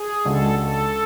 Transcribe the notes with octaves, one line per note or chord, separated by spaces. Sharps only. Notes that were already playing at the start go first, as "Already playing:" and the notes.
Already playing: G#4
C#2 C#3 G#3 D4 F#4 A4
A4